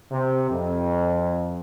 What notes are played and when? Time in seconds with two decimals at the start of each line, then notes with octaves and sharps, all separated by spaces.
0.11 C3
0.51 F2